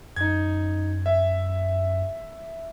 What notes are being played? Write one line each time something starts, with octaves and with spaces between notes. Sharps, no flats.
F#2 D#4 G#6
E5